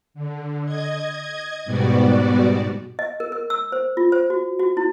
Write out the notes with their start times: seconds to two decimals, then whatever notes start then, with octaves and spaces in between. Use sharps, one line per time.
0.14 D3
0.65 D#5 G#6
1.65 G#2 B2 G3 B3 F#4 D5
2.99 D#5
3.20 A#4
3.32 A#4
3.50 E6
3.72 C5
3.97 F4
4.12 C5
4.30 F#4
4.60 F#4
4.77 E4